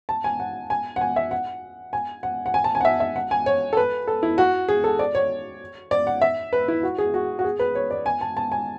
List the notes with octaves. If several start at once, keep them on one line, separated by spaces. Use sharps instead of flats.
A5
G#5
F#5
G#5
F#5
G#5
E5
F#5
G#5
F#5
F#5
G#5
A5
G#5
F#5
E5
E5
F#5
G#5
C#5
A4
B4
A4
E4
F#4
G#4
A4
D5
C#5
D5
F#5
E5
B4
E4
F#4
G#4
F#4
F#4
G#4
B4
C#5
D5
G#5
A5
A5
G#5